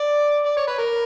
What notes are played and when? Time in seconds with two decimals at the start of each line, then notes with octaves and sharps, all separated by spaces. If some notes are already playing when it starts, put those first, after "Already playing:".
Already playing: D5
0.46 D5
0.57 C#5
0.67 B4
0.78 A#4